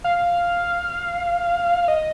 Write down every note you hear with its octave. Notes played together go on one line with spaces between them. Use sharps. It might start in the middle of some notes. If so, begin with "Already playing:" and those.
F5
D#5